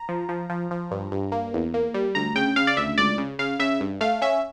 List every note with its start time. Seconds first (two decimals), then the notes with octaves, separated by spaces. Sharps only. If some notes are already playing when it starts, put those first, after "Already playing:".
Already playing: A#5
0.09 F3
0.29 F3
0.50 F3
0.71 F3
0.91 G2
1.11 G2
1.32 A#3
1.54 E2
1.74 A#3
1.94 G3
2.15 D2 A#5
2.36 C#3 G5
2.56 C#3 F5
2.67 D5
2.77 D2 E5
2.98 C#2 D5
3.18 C#3
3.39 C#3 F5
3.60 C#3 E5
3.80 G2
4.01 A3 F5
4.22 C#4 E5